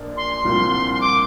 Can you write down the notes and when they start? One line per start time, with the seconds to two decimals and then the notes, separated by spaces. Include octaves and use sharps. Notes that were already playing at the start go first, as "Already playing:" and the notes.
Already playing: A#1 A#2 D4
0.17 C6
0.45 C2 A#2 F3 C4 F4
0.94 C6
1.01 D6